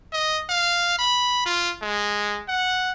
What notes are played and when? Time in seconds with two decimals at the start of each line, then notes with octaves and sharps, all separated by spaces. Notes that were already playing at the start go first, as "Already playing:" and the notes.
0.13 D#5
0.50 F5
0.99 B5
1.46 F4
1.82 G#3
2.48 F#5